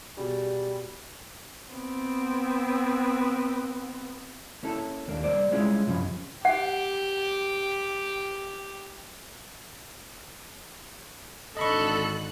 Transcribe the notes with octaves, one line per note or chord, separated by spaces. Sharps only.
B2 G3 F#4 G#4
B3 C4
A#3 C#4 E4 A4
D#2 A#3 D4
G3 A#3 C5 D5
G3 G#3 C#4 E4 F4 G#4
C2 F#2 F3 C#4 B5
G4 F#5
G#1 D3 A4 D#5 B5 C#6 F#6